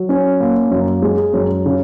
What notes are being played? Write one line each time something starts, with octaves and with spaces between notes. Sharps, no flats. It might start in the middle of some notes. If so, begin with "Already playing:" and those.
Already playing: F#3
C#4
A#3
F#2
G#3
F#2
C#3